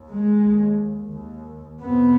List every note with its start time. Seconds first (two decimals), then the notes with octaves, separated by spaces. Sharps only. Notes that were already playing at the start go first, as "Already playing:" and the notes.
Already playing: D#2
0.10 G#3
0.43 D#2
1.12 D#2
1.80 F2 C3 B3